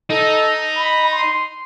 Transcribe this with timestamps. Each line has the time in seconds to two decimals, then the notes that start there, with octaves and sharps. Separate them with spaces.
0.10 D#4 A4
0.76 B5
1.11 C6